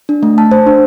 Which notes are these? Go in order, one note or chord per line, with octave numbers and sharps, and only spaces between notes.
D4
A3
A5
C5
D4